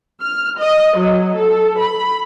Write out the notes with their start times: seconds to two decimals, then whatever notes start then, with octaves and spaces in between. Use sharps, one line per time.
0.21 F6
0.57 D#5
0.97 F#3
1.36 A4
1.79 B5